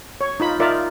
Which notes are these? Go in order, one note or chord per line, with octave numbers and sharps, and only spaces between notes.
C#5
D#4 F4 B5
D#4 F4 A#4 D5 E5